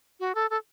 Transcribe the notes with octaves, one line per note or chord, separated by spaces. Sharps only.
F#4
A4
A4